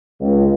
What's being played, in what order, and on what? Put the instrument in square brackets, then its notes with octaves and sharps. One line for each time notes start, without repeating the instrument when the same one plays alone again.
[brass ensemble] C#2